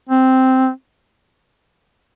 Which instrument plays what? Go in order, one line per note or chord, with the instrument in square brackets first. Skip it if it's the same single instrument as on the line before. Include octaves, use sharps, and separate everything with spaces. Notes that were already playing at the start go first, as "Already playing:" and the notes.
[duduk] C4